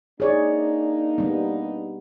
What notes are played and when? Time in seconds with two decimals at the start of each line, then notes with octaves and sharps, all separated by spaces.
0.20 A#3 D4 D#4 G#4 C#5 D5
1.18 G3 B3